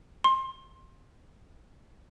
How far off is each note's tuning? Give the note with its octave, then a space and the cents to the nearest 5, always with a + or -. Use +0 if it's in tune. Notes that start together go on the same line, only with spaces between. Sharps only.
C6 +20